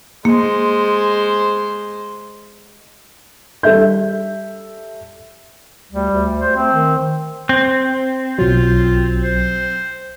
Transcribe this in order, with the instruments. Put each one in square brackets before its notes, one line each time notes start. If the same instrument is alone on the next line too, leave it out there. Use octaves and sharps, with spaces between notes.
[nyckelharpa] G#3 C5 [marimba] A#3
[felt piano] G3 A4 E5 G6
[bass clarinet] D2 [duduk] G3
[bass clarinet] D2
[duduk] C5
[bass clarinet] A3 [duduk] C4
[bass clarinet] D#3
[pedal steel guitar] C4
[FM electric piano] B1 F#3 [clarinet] F4
[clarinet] C5